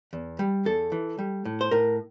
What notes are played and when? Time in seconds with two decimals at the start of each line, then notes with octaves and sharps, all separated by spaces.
0.13 E2
0.39 G3
0.65 E2 A4
0.92 E3
1.19 G3
1.45 A2
1.61 C5
1.71 A2 A#4